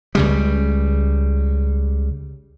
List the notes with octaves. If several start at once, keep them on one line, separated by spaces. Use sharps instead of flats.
C#2 C#3 G3